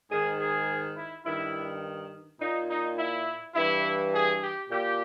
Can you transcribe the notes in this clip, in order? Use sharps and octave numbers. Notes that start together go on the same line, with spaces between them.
G#2 D#3 G#4
G#4
E4
G2 D#3 E4
A#2 D#4
D#4
E4
G2 E3 E4
G#4
G4
A#2 G4